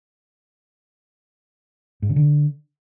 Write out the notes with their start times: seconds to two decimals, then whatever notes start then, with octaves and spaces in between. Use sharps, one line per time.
2.02 G#2
2.09 C#3
2.16 D3